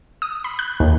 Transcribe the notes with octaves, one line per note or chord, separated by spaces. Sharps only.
D#6
B5
F#6
D#2